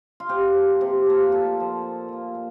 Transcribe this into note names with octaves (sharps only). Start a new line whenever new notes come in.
F4
C3 G4
F3 A#3
C3
F3 A#3
A#2 A4
F3 A#3
A#2
F3 A#3
A#2